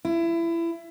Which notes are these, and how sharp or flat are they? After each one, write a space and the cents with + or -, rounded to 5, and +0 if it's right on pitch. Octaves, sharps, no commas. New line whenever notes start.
E4 +25